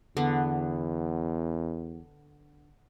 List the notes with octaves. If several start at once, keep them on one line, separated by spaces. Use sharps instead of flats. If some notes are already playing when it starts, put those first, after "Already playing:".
E2 D3 B3